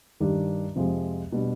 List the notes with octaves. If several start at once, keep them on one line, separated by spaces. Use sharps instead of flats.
G2 D#3 G3 D4
F2 C3 F3 G#3 C4
B2 G3 D4